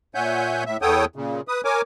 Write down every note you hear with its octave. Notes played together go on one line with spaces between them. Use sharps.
A#2 C#5 E5 F#5 G#5 G6
A2 E5
E2 B3 A4 C#5 G5 D#6
A#2 C#3
B4 D#6
A#4 C#5 G#5 D6